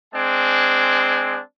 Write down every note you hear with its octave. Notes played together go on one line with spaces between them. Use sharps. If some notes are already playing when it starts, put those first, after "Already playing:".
G#3 C4 D4 G#5